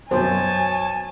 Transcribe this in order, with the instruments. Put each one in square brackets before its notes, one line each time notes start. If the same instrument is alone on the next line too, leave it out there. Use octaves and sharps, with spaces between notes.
[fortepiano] F#2 B2 [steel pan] C5 [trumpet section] C#5 A5 [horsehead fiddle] G#5